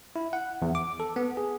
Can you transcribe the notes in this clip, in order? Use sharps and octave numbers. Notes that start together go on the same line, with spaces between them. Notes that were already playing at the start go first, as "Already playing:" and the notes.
E4
F#5
E2
D6
A4
B3
G#4